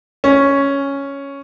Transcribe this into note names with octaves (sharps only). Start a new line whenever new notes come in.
C#4